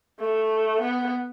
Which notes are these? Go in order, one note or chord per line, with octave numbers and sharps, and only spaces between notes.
A3
B3